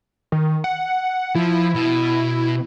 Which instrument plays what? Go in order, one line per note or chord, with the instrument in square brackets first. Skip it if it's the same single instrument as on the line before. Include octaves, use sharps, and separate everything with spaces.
[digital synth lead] D#3
F#5
[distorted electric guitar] F3 [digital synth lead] E4
[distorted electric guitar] B2